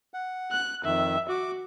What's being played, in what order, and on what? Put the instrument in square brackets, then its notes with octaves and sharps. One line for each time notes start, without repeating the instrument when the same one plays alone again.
[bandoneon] F#5
[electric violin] F#6
[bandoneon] F2 D#3 [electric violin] E5
[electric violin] F#4 [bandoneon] D6